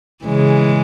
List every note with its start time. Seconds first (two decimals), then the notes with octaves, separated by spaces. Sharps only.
0.25 C#3 E3 G#3